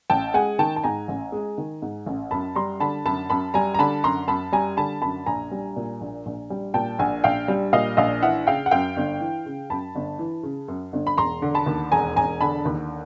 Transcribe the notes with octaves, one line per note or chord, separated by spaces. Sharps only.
A1 G5 A5
G#3 F#5 G#5
D#3 G5 A5
A5
G#2 G#5 A#5
A1
G#3
D#3
G#2
A1
F#2 A5 B5
G3 A#5 C6
D3 A5 B5
F#2 A5 B5
F#2 A5 B5
G3 G#5 A#5
A#5
D3 A5 B5
F#2 A#5 C6
F#2 A5 B5
G3 G#5 A#5
D3 A5 B5
F#2 A5 B5
A#1 G#5 A#5
G3
A#2
A#1
A#1
G3
A#2 G5 A5
A#1 F#5 G#5
A#1 F5 G5
G3
A#2 D#5 F5
A#1 D#5 F5
E3 E5 F#5
C#3 F5 G5
F#5
F#2 F5 G5
G1
E3
C#3
F#2 A5 B5
G1
E3
C#3
F#2
G1
B5
E1 A#5 C6
D3
A5 B5
D#2
E1 G#5 A#5
E1 G#5 A#5
D3 A5 B5
D#2